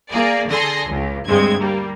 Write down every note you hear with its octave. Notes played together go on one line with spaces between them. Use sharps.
A#3 G#4 D5
D3 G#4 A4 C6 A#6
C#2
D2 G2 G#3 C4 G#6
G3 A#3